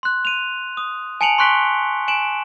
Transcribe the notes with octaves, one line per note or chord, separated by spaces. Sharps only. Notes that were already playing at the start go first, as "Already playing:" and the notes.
C6 F#6
D#7 F7
D#6
G#5 A5 C#7 D7 F7 F#7
C6 C#6 F#6 B6 D7 G7
G#5 D7 E7 F#7